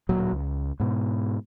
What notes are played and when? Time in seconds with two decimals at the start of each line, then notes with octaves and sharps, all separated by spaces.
0.09 D1 A#2 F#3
0.32 C#2
0.80 G#2 B2